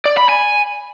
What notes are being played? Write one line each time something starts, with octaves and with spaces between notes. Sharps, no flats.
D5
B5
G#5